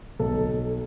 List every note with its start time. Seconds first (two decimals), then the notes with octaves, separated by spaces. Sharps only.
0.19 B1 A4